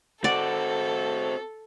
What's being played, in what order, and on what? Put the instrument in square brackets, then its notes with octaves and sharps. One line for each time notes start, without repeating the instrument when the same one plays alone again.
[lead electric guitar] C4 F#4 [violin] A4 [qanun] D5 F#5